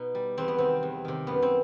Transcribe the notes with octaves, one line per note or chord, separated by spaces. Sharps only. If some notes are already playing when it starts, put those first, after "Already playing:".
Already playing: B2 D#4
G3
E2 C4
B3
C3 D#3 C4
E2
C3 D#3
F#2 B3
C4